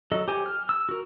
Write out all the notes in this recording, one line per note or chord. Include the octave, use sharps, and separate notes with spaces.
F#3 A4 D#5
G4 C5 G#5
F6
E6
F#4 A#4